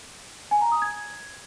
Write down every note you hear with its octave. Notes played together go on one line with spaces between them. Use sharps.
G#5
A#5
D#6
G#6